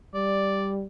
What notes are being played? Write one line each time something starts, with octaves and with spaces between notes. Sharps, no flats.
G3 D5